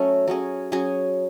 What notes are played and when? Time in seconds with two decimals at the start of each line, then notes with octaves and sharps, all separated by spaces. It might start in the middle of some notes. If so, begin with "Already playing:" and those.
Already playing: F#3 A3 C#4
0.27 F#3 C#4 G#4
0.72 F#3 C#4 G#4